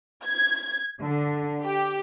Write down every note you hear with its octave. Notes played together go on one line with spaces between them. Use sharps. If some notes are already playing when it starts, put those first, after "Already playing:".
G#6
D3
G4